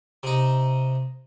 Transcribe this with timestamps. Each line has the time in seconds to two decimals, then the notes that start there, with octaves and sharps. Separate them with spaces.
0.23 C3 D#4